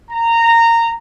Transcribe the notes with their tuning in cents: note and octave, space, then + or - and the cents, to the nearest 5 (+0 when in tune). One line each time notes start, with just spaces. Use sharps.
A#5 -15